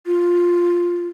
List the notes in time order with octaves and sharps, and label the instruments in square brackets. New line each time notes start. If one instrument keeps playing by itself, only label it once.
[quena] F4